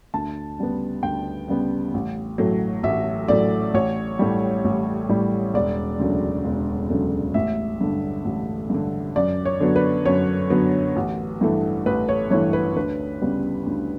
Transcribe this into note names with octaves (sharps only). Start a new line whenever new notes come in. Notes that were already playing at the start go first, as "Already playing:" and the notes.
D2 A5
C#3 G3 B3
D2 G5
C#3 G3 B3
A1
A2 F#3 A3
A1 E5
A2 F#3 A3 D5
A1 C#5
A2 G3
A1
A2 G3
E1 D5
D2 C#3 F#3 A3
E1
D2 C#3 F#3 A3
A1 E5
G2 D3
A1
G2 D3
F#2 D5
C#5
D3 F#3 B3
B4
F#2 C#5
D3 F#3 B3
A1
G2 E3 A3
A1 B4
C#5
G2 E3 A3 C#5
B4
D2 B4
C#3 G3 B3
D2